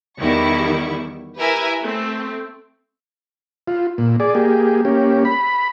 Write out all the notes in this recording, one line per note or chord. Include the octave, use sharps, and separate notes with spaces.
E2 D#3 G3 E4 C#6
E4 G4 A#4 B4 E5 G#5
A3 C4
F4
A#2
G#4 D5
A#3 G4 G#4
A#3 C#4 G4
B5